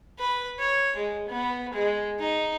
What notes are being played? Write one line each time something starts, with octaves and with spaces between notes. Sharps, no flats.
B4
C#5
G#3
B3
G#3
D#4